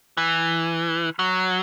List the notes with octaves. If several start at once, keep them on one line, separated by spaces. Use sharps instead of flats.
E3
F#3